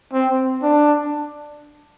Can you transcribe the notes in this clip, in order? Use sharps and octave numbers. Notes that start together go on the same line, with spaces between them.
C4
D4